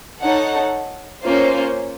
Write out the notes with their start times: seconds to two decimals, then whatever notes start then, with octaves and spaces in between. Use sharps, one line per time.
0.21 D#4 A4 C#5 F#5
1.24 A#3 C#4 F4 C5